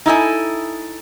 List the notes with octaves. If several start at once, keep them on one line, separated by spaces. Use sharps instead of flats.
D#4 E4 A4 G#5